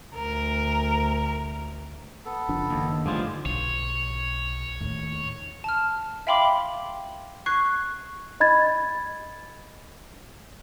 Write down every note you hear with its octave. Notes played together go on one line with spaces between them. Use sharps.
D2 A#4
B3 A4
F#1 F3 D4
D#2
G2 D3 F3 A3 F4 G#4
B1 C#5
D#2 A2
A5 F6
E5 F5 G5 B5 C6 D6
C#6 F#6 G#6 C7
D#5 B5 G#6 A6